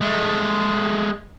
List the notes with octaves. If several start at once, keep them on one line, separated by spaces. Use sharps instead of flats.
G#3 A3